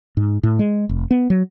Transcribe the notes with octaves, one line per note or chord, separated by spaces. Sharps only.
G#2
A2
G#3
F1
B3
F#3